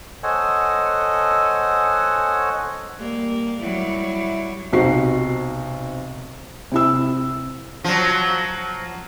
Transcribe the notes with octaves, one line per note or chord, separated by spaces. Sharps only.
A4 C5 C#5 D#5 F#5 G#5
G3 A#3
F#3 G3 E4
B1 C3 D#4 F#4 C5 C7
C3 E4 E6
F3 F#3